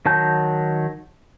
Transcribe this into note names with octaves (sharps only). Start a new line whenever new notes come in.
D#3 F#3 A5 G6